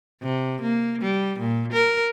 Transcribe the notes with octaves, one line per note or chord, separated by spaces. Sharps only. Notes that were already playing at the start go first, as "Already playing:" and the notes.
C3
A#3
G3
A#2
A#4